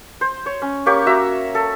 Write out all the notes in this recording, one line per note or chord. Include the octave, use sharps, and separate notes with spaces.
C5
C#5
C#4
A#3 G4 C#5 C#6
F#4 E5 A#5
A4